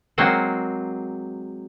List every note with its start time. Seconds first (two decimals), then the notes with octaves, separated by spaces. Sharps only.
0.18 F#3 G#3 A#3 C4